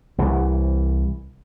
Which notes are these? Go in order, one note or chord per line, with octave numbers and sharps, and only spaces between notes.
C2 E3